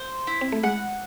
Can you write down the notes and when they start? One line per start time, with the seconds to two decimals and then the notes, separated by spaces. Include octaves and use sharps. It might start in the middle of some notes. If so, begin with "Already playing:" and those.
Already playing: C5
0.27 E4
0.41 C4
0.52 A3
0.63 G#3 F#5